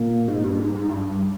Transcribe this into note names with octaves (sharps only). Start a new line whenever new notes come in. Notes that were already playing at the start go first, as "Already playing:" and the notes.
Already playing: A#2
G#2
G2
G#2
G#2
G2